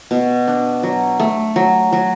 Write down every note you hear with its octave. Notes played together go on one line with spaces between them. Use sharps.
B2
D4
F#3
A3
F#3
F#3